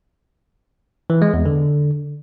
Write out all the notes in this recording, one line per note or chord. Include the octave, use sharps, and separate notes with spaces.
E3
G#3
E2
D3